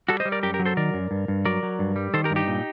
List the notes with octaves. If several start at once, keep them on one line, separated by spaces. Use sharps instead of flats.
G3 F#4 A4
C5 D#5
G3
A#4 D5
F#2 G4 A#4
G4 A#4
F#3
A4 C5
D#3 A#4 D5
F#2
G2
G2
F#3 A#4 D5
F#3
G2
G3
D#3 A4 C5
G4 A#4
G2
D#4 G4
A#2